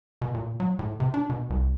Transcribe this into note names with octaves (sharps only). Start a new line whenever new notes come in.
B2
A#2
F#3
A2
C3
D4
B2
C2